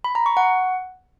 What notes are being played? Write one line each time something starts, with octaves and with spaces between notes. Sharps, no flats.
B5
A#5
C#6
F#5